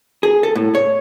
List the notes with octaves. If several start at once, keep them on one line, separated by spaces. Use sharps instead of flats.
G#4
A4
A2
C#5